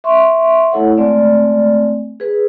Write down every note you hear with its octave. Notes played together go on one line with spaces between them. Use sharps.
E5 C6 C#6
A3 E4 A4 C#5 F#5
G#3 A3 C4 D5
G#4 B4